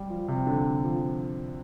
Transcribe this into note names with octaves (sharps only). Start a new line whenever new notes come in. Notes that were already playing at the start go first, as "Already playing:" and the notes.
Already playing: G3
F3
C3
D3
F3